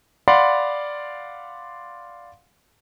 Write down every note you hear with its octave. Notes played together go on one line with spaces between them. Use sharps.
D5 F5 F#5 B5 C6